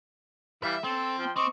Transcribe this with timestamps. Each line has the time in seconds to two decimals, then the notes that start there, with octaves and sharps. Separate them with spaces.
0.63 E3 G3 E5 F5
0.84 C4 A4
1.18 F3 G5 C6
1.36 C4 D#5 C#6 D6